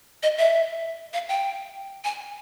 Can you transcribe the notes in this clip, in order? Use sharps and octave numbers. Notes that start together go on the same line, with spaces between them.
D#5
E5
F5
G5
G#5